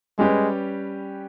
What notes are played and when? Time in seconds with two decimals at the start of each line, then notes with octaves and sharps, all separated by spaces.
0.19 G3 G#3 C#4 G4 B4